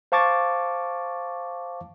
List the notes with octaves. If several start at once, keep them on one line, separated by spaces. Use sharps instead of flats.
C5 F5 A5 C#6 D6 A6